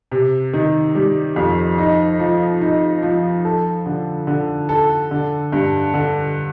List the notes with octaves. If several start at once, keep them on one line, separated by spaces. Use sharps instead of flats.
C3
D#3
G3
F2
D#4
F3
D#4
F3
A4
D3
D3
A4
D3
G2
D3